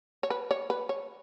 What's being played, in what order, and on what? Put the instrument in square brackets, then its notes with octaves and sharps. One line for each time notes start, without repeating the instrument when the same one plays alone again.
[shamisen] C#5
B4
C#5
B4
C#5